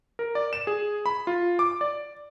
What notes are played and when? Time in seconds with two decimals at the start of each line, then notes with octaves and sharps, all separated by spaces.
0.19 A#4
0.35 D5
0.53 E7
0.67 G#4
1.06 B5
1.27 F4
1.59 D6
1.81 D5